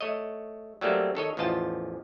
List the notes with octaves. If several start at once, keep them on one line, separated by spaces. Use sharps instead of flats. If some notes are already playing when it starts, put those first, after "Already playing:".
A3 C#5 D#5
F#3 G3 A3 A#3 C4
D#3 A4 C#5 D#5
A1 E2 F3 F4 D#5 A5